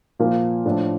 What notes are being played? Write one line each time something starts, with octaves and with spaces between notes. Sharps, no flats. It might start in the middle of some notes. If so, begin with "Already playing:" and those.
A#2 F3 A#3 F4 A#4
A2 F3 A3 D4